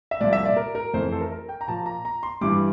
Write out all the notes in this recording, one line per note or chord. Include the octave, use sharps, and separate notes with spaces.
E5
C2 A#2 F3 D5
E5
D5
A#4
A#4
F2 E3 A3 C4 C5
A4
A#4
A#4
G5
A#5
A#2 F3 A#3 A5
A#5
A#5
C6
G2 E3 G3 D6